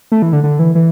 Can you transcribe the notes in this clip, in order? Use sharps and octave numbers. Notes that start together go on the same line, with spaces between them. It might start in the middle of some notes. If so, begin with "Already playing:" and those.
A3
E3
D3
D3
E3
E3